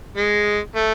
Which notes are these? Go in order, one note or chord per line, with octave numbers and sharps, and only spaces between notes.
G#3
A3